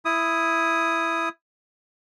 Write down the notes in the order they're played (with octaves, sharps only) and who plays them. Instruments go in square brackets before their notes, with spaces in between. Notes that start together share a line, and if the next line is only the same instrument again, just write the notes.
[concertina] E4 D#6